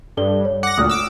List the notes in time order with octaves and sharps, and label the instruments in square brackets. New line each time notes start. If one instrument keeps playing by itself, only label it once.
[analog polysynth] G2 [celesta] A4 D5 G7
[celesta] C#5
[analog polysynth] F#5 A#6 [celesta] D6
[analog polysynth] D2 A#2 [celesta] D#6 F6
[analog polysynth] D6 E6